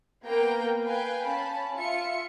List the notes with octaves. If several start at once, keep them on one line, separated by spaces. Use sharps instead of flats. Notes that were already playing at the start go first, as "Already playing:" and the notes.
A#3 B3 G5 A#5
B4 F5 G5 G#5
C#4 A5 B5
F4 E5 C#7